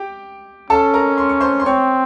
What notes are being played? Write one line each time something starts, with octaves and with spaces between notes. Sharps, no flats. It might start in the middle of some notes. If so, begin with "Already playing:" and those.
Already playing: G4 G5
C#4 A4 A5
A#4 A#5
C6
C#6
C5 C6
C6
C4 C#5 C#6